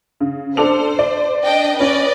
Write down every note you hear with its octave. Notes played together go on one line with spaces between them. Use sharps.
C#3
D4 A4 C5 F7
D5
D4 D#5 G5
C#4 B4 D5 D#5